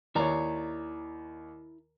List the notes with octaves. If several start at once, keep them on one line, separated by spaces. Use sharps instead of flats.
D#2 E4 C#5 D5 A#5